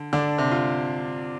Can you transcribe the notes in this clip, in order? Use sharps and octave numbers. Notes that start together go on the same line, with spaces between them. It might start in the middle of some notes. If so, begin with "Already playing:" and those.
Already playing: D3
D3 D4
C3
F4